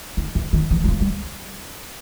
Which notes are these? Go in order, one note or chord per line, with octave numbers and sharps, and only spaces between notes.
D#3
E3
D#3
E3
F#3
F3
G3